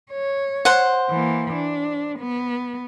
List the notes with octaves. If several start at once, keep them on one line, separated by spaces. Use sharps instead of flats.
C#5
C5 F#5
E3 A#3
D4
B3